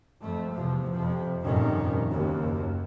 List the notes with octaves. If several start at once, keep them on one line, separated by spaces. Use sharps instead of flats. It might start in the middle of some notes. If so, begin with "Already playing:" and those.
F2 A3
E2 C3 F3
F2 C3 F3
F1 G2 A#2 D#3 C#4
F#1 D#2